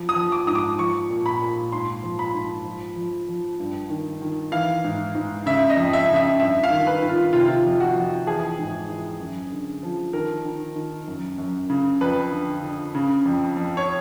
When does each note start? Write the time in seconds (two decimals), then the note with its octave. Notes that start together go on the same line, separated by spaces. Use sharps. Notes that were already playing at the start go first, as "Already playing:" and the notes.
Already playing: F3
0.09 D#6
0.16 F3
0.32 D6
0.47 G#2 D#6
0.55 D6
0.79 F3 C#6
1.10 A#2
1.26 B5
1.41 A#2
1.72 G#2 C6
2.04 F3
2.19 B5
2.34 G#2
2.65 F3
2.96 F3
3.29 F3
3.60 G2
3.90 D#3
4.22 D#3
4.52 E3 F5
4.84 G#2
5.15 G#2
5.46 C#3 E5
5.70 D#5
5.77 F2
5.93 E5
6.09 C#3
6.16 E5
6.40 G2 E5
6.63 F5
6.71 D#3
6.87 B4
7.02 D#3
7.09 F4
7.33 C3 F4
7.48 F4
7.65 F2
7.80 F#4
7.96 F2
8.27 E3 G#4
8.58 G#2
8.90 E3
9.20 F#2
9.52 D3
9.83 F3
10.13 D#3 A#4
10.45 D#3
10.75 D#3
11.08 F#2
11.38 F#2
11.70 C#3
12.01 F2 B4
12.31 D3
12.63 D3
12.95 C#3
13.25 F2
13.57 F2
13.77 C#5